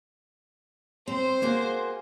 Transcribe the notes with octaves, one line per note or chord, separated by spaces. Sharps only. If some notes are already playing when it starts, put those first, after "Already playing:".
C4 C5
A#3 F#4 G#4